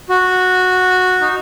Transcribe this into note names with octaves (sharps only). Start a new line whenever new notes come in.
F#4
D#4